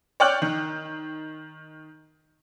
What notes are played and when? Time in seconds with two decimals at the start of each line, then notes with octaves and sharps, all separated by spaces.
0.20 C#5 D5 G5 F6 F#6 F#7
0.42 D#3